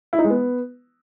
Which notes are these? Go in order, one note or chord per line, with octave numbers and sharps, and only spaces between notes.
E4
D#4
G#3
B3